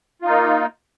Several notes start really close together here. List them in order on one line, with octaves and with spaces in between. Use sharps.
F4 D#4 A#3